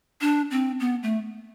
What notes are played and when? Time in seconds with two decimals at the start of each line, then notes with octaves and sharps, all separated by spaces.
0.21 D4
0.51 C4
0.80 B3
1.03 A3